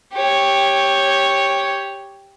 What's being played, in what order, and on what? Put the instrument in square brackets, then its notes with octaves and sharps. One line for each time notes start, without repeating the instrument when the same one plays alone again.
[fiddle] G4 C#5